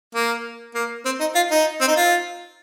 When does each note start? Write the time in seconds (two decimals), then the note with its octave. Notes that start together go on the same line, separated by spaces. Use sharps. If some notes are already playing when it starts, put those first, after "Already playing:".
0.14 A#3
0.74 A#3
1.05 C4
1.20 D#4
1.35 F4
1.51 D#4
1.81 C4
1.88 D#4
1.96 F4